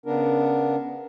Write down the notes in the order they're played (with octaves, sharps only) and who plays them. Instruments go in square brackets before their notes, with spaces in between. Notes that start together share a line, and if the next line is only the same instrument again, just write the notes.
[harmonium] C#3 B3 D4 A#4